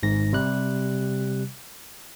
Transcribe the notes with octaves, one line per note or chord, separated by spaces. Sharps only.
G#1 G#2 A#6
C3 G3 F#6